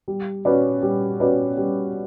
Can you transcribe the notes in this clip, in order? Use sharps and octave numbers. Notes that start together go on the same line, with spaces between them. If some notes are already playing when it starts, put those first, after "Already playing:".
G3
C#4 F#4 B4 D5
G3
C#4 F#4 B4 D5
G3